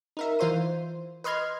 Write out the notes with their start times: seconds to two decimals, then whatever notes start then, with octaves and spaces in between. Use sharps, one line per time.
0.17 D#4 A#4 E5
0.39 E3 F4 C5 C6 D#7
1.24 B4 D#5 C6 F6 G#6